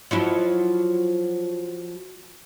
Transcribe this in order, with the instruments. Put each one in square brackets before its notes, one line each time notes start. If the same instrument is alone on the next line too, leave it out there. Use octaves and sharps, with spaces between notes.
[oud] F3 F#3 E4